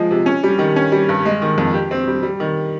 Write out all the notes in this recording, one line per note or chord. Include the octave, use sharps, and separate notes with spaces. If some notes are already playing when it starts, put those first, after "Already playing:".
Already playing: F3 G#3
C3
C#4
G3
D#3
C#4
G3
G2
G#3
D#3
F2
G4
C4
G3
G3
D#3